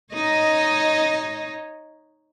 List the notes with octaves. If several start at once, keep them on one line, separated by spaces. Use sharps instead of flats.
D#4 C#5 D#5